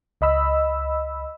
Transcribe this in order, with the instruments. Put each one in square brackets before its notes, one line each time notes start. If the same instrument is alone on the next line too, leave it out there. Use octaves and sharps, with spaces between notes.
[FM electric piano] C#2 D#5 B5 E6